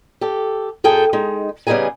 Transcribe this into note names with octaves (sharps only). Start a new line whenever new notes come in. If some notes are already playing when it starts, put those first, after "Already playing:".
G4 A4
F#2 G#4 A4 G5 A5
G#3 D#4
C#3 G3 B3 D#4 G#4 G#5